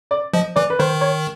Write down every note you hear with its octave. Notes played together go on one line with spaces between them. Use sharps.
D5
F3 D#5
E3 D5
B4
D#3 C5
C#5